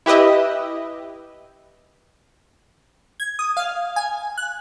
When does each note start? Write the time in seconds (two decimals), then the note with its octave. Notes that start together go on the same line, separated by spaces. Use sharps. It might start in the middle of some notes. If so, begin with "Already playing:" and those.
0.06 E4 G4 B4 D#5 E5
3.20 G#6
3.39 D#6
3.57 F5
3.96 G#5
4.37 F#6